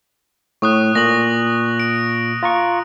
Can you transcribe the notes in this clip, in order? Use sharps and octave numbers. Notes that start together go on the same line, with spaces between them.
A2 C#6 D#6 F#6
A#2 A#6 F#7
D7
F4 A#5 C#6